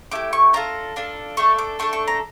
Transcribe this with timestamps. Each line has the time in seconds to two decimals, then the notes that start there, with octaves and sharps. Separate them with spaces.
0.11 A3 E4 G4 D6
0.33 C#6
0.53 D4 F4 A4 A#5
0.96 D4 F4 A4
1.37 A3 D4 A4 C#6
1.59 D6
1.79 A3 D4 A4 C#6
1.93 C#6
2.08 A#5